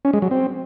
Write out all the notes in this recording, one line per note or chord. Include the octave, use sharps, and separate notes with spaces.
C#4
G#3
F#3
C4